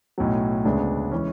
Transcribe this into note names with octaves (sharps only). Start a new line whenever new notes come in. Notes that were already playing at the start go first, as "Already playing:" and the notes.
B1 A2 F#3
D2 C#3 G#3 B3 D4
E3 G#3 C#4